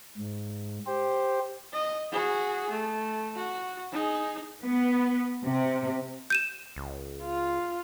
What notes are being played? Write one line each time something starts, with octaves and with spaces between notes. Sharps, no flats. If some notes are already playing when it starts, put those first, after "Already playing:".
G#2
G4 C5
D#5
F#4 G#4
A3
F#4
D#4 G#4
B3
C3
G6 D#7 E7
C#2
F4